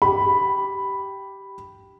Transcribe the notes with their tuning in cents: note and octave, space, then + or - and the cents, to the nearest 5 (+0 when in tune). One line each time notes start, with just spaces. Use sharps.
G4 -10 B5 +0